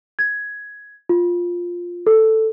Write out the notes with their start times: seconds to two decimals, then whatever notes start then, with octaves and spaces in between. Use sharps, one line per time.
0.19 G#6
1.09 F4
2.07 A4